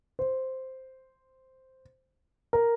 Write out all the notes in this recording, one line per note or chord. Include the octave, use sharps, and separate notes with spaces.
C5
A#4